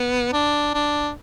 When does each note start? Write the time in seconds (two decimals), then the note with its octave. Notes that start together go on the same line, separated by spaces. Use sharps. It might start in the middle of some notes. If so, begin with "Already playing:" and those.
Already playing: B3
0.33 D4
0.74 D4